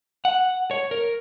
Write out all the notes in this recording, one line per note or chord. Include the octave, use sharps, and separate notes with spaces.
F#5
C#5
A#4